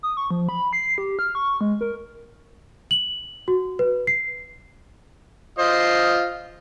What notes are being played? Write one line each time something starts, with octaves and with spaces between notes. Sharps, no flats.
D#6
C#6
F3
B5
C7
G4
F6
C#6
G#3
A#4
F#7
F#4
B4
C7
F4 C5 D#5